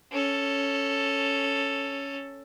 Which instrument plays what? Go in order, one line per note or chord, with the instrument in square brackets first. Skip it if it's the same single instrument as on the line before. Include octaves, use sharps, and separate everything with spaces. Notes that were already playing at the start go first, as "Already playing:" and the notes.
[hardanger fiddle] C#4 A4